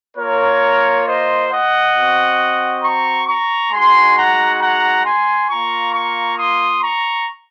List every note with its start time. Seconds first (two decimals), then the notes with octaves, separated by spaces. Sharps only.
0.17 A#3 F4 A#4 C#5
1.06 C5 D#5
1.51 D#5 F#5
1.95 C4 F#4
2.83 A#5 C#6
3.27 A#5 C#6
3.72 G#3 D#4 F#4 G#5 C6
4.17 F#5 A#5
4.60 F#5 A#5
5.05 G#5 C6
5.49 A#3 F4 A#5 C#6
5.93 A#5 C#6
6.38 C6 D#6
6.82 A#5 C#6